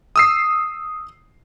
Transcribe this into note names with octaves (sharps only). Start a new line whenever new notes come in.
D#6 E6 C7